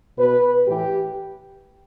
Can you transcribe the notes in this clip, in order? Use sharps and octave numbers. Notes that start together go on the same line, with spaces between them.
B2 B4
A2 E3 G4